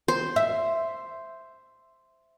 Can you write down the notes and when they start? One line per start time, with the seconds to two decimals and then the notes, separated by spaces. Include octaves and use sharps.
0.08 C5
0.36 E5